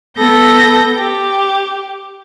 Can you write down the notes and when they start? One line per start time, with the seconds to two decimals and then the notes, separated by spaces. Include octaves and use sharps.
0.18 B3 A4 G6 A#6
0.97 G4